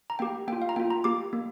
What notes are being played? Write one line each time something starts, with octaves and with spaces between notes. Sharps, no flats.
A#5
A#3 G4 G5
A#3 F4 G5
F5
A#5
A#3 F4 G5
A#5
A#3 G4 D6
A#3